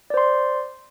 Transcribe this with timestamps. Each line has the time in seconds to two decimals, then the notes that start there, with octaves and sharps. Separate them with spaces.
0.10 D5
0.14 C5
0.17 C6